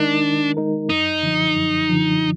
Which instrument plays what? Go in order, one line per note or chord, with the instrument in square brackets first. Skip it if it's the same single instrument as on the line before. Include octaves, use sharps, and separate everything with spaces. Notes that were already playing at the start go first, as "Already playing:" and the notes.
Already playing: [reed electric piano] D#3 G#3 D#4 A#4 [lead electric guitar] D4
[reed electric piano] D#3
G#3 D#4 A#4
[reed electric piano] F#2 [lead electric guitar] D#4
[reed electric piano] D3 F3
F#2
D3 F3